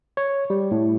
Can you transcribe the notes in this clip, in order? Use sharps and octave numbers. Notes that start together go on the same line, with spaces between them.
C#5
G3
A2